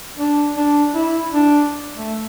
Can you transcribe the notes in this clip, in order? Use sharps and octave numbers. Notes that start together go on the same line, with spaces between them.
D4
D4
E4
D4
A3